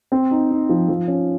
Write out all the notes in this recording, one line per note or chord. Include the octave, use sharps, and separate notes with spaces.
C4
D#4
D#4
F3
F3
C#4